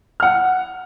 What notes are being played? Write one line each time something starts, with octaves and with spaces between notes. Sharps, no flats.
F#5 F6